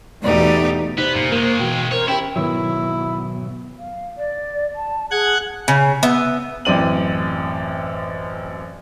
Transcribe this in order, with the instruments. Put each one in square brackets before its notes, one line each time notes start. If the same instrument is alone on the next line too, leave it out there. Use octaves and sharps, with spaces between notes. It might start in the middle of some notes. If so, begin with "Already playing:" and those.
[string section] E2 B2 [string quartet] A3 D#4 G4 [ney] D5
[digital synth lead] C3 [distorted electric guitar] B3 [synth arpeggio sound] D#4 [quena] C5
[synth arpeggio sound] F#2 [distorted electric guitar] A#2
[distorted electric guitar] D#3 G#3 [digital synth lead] A#3 [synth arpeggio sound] A#4
[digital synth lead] B2 [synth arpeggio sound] E3 F#4 F5 [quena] G5
[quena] A#4 [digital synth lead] C5 [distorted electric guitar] C#5
[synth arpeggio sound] C#4 G4 [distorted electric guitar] E4 [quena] G5
[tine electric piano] G#2 D#3 B4 [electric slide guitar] B2 F#3 [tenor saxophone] E4
[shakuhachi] F5
D5
A5
[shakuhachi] G#4 [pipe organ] F#5 F#6 G#6
[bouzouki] C#3
B3 E5
[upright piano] A1 F#2 C4 D5 D#7 F#7